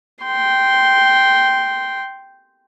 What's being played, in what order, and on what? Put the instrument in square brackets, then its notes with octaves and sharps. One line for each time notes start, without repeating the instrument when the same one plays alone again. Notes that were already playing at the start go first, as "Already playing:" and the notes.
[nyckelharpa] G5 C6